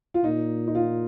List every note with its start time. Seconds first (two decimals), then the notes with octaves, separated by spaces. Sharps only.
0.14 F4
0.24 A#2 D#4
0.67 D#4
0.75 F4